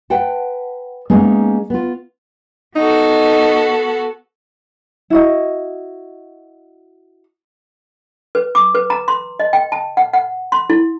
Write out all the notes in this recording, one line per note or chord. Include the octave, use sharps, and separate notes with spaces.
B4 F#5 G5 A5
G#3 A#3 B3 C#4 D#4 G#4
B3 F4
B3 D#4 F#4 A4
E4 F#4 D#5
B4
D6
B4
A#5
C6
D#5
G5
A5
F#5
F#5
C6
E4